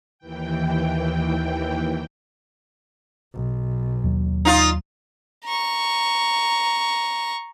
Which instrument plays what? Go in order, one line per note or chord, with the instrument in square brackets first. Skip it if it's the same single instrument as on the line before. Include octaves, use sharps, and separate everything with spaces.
[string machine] D#2 E3 G5
[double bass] B1
[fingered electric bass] D#2 F#3
[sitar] D#4 F4
[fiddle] A#5 C#6